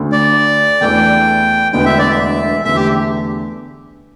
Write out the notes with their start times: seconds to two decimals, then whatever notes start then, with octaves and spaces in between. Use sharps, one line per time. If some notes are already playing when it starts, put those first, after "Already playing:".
Already playing: D2 D3 A3
0.12 D5
0.81 E2 E3 A3 D4 G5
1.72 E1 D2 D3 B3 G5
1.85 E5
1.99 D5
2.11 E5
2.64 E2 D3 A3 E5
2.76 G4